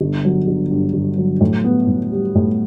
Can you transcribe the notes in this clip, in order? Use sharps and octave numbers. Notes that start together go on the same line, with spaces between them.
G1
F#3
G1
G2
G1
F#3
A2
B3
A2
G3
A2